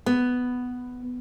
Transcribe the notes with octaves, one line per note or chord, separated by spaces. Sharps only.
B3